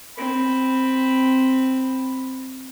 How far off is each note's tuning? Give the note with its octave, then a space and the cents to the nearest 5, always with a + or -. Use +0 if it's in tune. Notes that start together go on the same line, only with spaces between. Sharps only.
C4 +0 B5 +0